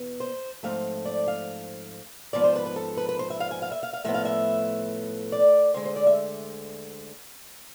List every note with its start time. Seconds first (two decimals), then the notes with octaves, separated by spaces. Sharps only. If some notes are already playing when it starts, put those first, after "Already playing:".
Already playing: E2 B2 B3
0.20 C5
0.63 G#2 F3 A3 C4 F5
1.05 D5
1.28 F5
2.33 G#2 F3 B3 D5
2.44 C5
2.56 B4
2.66 B4
2.76 A4
2.97 B4
3.09 B4
3.19 C5
3.30 E5
3.40 F5
3.51 G#5
3.62 F5
3.72 E5
3.83 F5
3.93 F5
4.05 A2 F3 B3 E5
4.14 F5
4.25 E5
5.32 D5
5.74 D2 D3 G#3 C5
5.85 C5
5.96 D5
6.06 E5